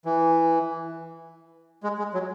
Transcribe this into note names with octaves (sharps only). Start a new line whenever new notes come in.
E3
G#3
G#3
F#3